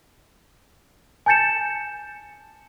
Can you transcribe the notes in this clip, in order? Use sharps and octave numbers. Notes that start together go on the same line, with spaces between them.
G#5 A5 G6 A6 C#7 E7